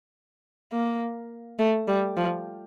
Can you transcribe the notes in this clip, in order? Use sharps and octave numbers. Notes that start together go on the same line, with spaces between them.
A#3
A3
G3
F3